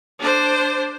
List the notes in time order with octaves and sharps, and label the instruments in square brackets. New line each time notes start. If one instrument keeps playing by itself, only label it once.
[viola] D4 C5